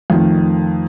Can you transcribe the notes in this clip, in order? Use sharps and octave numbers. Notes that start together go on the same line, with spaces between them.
F2 D#3 A3